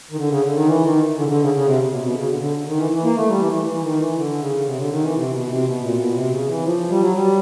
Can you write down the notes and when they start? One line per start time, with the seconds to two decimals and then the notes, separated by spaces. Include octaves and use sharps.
0.11 D#3
0.16 D3
0.28 C#3
0.42 D3
0.54 D#3
0.66 E3
0.82 D#3
1.16 D3
1.23 C#3
1.28 D3
1.41 C#3
1.53 C#3
1.65 C3
1.90 B2
2.02 B2
2.10 D3
2.15 C#3
2.27 D3
2.40 D3
2.66 D#3
2.77 E3
2.90 E3
3.03 A#3
3.15 A3
3.27 G3
3.39 E3
3.52 E3
3.65 E3
3.81 D#3
3.98 E3
4.14 D3
4.39 C#3
4.64 C3
4.77 D3
4.90 D#3
5.01 E3
5.14 C3
5.31 B2
5.47 C3
5.64 B2
5.81 A#2
5.97 B2
6.13 C3
6.31 C#3
6.47 E3
6.63 F3
6.89 G3
7.00 F#3
7.13 G3